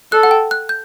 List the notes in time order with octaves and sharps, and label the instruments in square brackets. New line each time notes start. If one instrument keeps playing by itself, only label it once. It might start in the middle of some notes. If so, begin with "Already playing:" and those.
[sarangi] A4 [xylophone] F#6
[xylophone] F#5
G5
F#6
G6